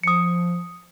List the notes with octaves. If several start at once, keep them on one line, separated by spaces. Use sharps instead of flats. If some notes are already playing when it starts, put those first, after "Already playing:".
F3 D#6 C#7